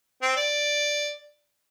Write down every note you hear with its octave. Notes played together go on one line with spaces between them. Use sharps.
C4
D5